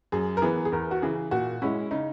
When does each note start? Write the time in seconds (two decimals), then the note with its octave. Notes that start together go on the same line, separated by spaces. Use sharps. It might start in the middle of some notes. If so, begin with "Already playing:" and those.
0.12 F#2 G#4
0.37 A#4
0.42 E3 B3 G#4
0.65 G#4
0.72 E2 A#4
0.91 F#4
1.02 C#3 E3 G#4
1.31 A#2 F#4
1.62 G#3 C#4 E4
1.91 C#3 D#4